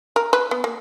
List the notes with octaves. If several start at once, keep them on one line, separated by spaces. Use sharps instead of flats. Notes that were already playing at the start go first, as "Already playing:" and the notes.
A#4
B4
B3
A#3